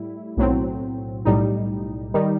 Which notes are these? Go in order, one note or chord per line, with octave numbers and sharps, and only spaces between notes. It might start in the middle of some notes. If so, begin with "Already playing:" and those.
Already playing: A2 G3 E4
B1 A2 F#3 C4
B1 A2 G3 D#4
D#3 G3 D#4